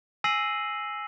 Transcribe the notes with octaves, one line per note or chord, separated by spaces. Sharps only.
G#5 E6 A#6 C7 D#7 F#7